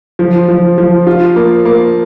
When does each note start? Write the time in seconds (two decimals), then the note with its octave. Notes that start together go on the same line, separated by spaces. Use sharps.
0.19 F3
0.48 F3
0.78 F3
1.07 F4
1.36 A#3
1.65 A#3